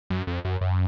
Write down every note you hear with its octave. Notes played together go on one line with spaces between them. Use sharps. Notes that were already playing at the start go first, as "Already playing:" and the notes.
F#2
F2
F#2
F#2